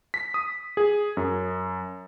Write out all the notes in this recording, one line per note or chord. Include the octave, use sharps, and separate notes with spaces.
B6
D#6
G#4
F#2